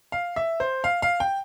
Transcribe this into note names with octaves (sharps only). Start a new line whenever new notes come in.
F5
E5
C5
F5
F5
G5